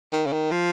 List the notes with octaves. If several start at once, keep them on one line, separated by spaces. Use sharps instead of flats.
D#3
C#3
D#3
F3